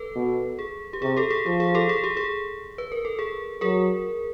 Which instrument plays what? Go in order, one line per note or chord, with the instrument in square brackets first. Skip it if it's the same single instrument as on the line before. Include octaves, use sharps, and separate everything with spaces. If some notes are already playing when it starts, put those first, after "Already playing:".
Already playing: [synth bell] A4 B4
[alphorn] B2
[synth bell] G#4
G4
[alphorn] C3 [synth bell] G#4
[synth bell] G4 A4
G#4
[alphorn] F3 [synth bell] G4
[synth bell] G#4
G4 A4
G#4
G4
G#4
B4
A#4
A4
G#4
[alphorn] F#3 [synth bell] G#4 A#4